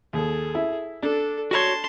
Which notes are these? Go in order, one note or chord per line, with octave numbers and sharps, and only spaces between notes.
D#2 G#4 A4
E4
D4 A4
F#4 C#5 A5 C6